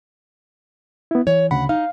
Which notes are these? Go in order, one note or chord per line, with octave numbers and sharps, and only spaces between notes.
B3 E4
E3 C#5
D2 C#3 F#5 B5
D#4 F5